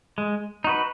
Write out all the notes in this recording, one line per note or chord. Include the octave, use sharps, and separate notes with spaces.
G#3
D#4 F#4 B4